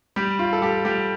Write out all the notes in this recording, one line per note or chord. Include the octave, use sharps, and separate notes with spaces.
G3 G4
F4
A4
G3 G4
G3 G4